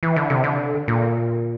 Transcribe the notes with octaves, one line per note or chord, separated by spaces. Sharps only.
E3
D3
C3
D3
A#2